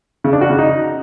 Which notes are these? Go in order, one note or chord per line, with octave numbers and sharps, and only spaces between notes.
C#3
D4
F#4
C#3
D#4